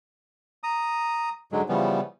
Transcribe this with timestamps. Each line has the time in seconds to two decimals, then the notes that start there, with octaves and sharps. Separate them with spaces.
0.63 A#5 D#6
1.52 G#2 D3 F#3 G#3
1.69 C#3 E3 F3 G3 B3